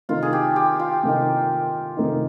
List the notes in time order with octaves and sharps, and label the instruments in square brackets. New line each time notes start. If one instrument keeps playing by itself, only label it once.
[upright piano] C3 D#3 A#3 D#4 [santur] F4
[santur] G#4
G4
G4
F4
[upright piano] C3 D#3 A#3 D#4
C3 D#3 A#3 D#4